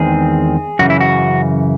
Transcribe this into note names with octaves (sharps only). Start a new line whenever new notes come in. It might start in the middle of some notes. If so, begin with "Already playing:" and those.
Already playing: E2 D#3 G#3 C4 G#4
F#2 C#3 E3 F#4
E4
F#4